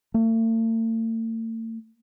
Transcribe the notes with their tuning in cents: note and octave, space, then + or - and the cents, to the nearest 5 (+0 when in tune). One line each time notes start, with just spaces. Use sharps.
A3 +45